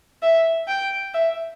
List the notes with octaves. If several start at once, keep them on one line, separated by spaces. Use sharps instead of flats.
E5
G5
E5